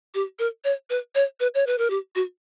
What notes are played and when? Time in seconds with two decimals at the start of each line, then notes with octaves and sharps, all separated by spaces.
0.14 G4
0.39 A#4
0.64 C#5
0.90 B4
1.15 C#5
1.40 B4
1.55 C#5
1.67 B4
1.78 A#4
1.90 G4
2.15 F#4